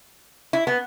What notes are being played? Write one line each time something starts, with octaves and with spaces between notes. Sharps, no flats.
E4
B3